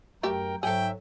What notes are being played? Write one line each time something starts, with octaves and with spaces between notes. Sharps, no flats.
F#2 A3 G4 A#4 E5 G5
G#2 F#3 G#4 A4 E5 G5